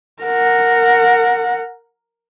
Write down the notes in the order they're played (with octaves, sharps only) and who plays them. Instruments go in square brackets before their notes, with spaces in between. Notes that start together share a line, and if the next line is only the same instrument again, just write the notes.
[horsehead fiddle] A#4 F#5